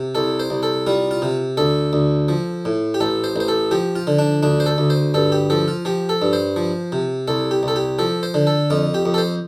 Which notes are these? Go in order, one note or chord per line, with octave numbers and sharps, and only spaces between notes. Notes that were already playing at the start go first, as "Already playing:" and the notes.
Already playing: C3
C2 A4
C5
C2
A4
G3 F4
F4
C3
D2 A4
D2
F3
A2
G4
A1 A4
C5
A1 C5
A4
F3 G4
F4
D3
D4
D2 D4
C5
A4
D2
C5
G2 A4
G4
F3 A4
F4
F3 G4
A4
G2
C5
F3
C3
C2 A4
G4
C2 A4
G4
F3 A4
C5
D3
A4
F2 F4
G4
F2
A4
C5